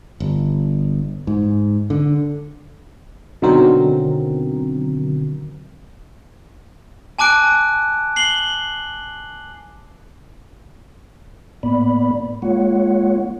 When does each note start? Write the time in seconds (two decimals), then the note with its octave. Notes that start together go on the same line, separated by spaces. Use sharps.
0.20 G1
1.27 G#2
1.90 D3
3.42 B2 D3 D#3 F#3 C4 A#4
7.19 G#5 A5 D6 F#6 D7
8.16 C7 F#7 G7
11.63 A2 A#3 B3 D5 B5
12.42 G#3 A#3 F4 C#5 F#5